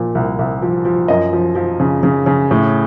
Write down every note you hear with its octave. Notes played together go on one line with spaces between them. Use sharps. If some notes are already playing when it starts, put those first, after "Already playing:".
Already playing: A#2 F3
C2
C2
F3
F3
F#2 D#5
F3
F3
C#3
C#3
C#3
A2